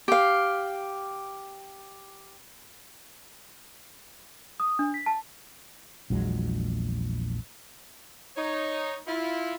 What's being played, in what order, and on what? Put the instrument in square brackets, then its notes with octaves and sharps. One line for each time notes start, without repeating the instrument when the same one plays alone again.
[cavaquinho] G4 F5
[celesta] D#6
D4
B6
A5
[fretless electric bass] A#1 E2 F#3 G#3
[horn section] D#4 C#5
E4 F4